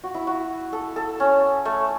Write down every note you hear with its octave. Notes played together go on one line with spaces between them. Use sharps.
F#4
E4
F#4
A4
A4
C#4
A3